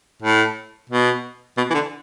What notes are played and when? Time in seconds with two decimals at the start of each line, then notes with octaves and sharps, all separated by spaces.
0.22 A2
0.90 B2
1.57 B2
1.71 E3
1.74 D3